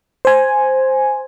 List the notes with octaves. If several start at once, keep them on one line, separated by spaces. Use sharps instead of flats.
C5 G#5